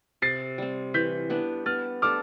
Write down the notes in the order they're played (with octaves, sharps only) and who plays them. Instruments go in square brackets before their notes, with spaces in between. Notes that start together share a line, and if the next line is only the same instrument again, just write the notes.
[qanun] C3 [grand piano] A6 C7
[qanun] G3 C4
[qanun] E3 [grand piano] G6 B6
[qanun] B3 D4 G4
[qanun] B3 [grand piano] F6 A6
[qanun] D4 A4 [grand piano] D6 F6